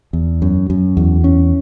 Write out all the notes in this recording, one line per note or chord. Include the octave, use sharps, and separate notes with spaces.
E2
F#2
F#2
E2
C#4